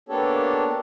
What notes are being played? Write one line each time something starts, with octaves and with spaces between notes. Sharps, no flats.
A#3 B3 D4 G4 A4 C#5